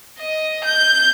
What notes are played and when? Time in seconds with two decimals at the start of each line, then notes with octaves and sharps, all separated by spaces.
0.19 D#5
0.64 G6